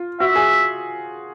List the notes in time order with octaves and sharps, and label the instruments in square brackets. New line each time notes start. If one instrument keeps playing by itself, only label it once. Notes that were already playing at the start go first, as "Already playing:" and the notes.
Already playing: [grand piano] F4
[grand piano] F#4 [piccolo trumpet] E5
[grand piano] G#4